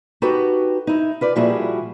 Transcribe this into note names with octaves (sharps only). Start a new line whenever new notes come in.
D#4 F#4 G4 A4 B4
D#4 E4
F4 B4 D5
A#2 F3 G3 E4 F#4 G#4